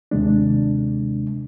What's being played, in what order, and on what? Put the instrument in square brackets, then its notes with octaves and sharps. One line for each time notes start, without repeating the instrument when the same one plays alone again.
[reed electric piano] D#2 C3 G#3 D4